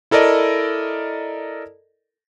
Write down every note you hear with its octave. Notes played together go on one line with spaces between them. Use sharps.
E4 A4 A#4 D5 D#5